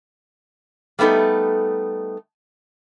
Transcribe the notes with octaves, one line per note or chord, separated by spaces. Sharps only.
G3 A3 B3 D#4 A4